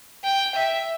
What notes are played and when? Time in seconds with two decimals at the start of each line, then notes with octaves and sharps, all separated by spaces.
0.23 G5
0.55 E5